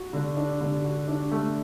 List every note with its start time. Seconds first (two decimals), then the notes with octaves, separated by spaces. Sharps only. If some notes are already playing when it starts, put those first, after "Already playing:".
Already playing: F#4
0.13 D3
0.37 D4
0.61 D3
0.84 F#4
1.08 D4
1.32 A3